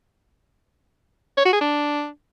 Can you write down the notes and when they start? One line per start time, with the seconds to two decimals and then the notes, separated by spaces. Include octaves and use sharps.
1.38 C#5
1.45 F#4
1.53 G#4
1.61 D4